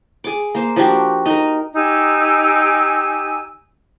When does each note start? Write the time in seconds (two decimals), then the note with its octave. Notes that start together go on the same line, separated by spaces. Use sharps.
0.24 G#4 D6
0.55 A#3 C5
0.76 F3 D4 F#4 G4
1.26 D#4 A#4
1.74 D#4 G4 G#5 E6